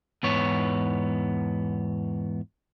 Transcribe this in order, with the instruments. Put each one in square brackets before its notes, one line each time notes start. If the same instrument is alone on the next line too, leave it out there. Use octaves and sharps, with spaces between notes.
[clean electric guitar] E2 G#2 B3 C#5